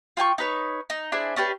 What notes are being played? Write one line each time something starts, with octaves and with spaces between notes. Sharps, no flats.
F4 G5 G#5 C#6
D#4 B4 C#5
D#4
D4 E4 G#4 C5
C#4 D4 G4 B4